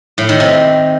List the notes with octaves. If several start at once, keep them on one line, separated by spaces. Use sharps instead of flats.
A2
D#3
C3